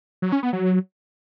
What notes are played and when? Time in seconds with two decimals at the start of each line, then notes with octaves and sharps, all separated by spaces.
0.22 F#3
0.32 C#4
0.43 B3
0.53 F#3